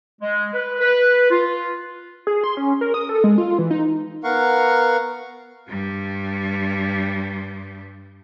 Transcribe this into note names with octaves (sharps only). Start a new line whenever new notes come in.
G#3
B4
B4
F4
G#4
C6
C#4
A#4
D#6
A4
G#3
F4
E3
D#4
B3 A#4 F5 F#5 C#6
G2 G3